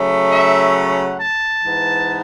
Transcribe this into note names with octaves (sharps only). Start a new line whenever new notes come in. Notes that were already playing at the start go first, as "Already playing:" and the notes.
Already playing: C#3 F#3 A3
E5
F#5
A5
G#2 E3 B3